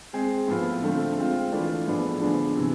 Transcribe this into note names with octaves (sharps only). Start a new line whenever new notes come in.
G#3 C4 G#4
A2 F3 B3 F4
D3 F3 A3 C4 F4
G#3 C4 F4
E3 A3 D4 F4
A2 F3 B3 D4 G#4
D3 F3 B3 D4 G#4
C3 E3